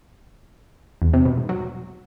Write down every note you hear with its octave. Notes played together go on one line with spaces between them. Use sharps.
E2
C3
B2
G#2
F#3